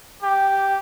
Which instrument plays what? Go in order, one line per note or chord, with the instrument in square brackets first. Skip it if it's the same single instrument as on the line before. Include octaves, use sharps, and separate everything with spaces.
[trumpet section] G4